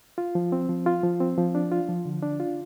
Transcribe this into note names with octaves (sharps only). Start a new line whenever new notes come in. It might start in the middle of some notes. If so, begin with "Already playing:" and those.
F4
F3
C4
F3
F4
F3
C4
F3
D4
F4
F3
D3
D4
F4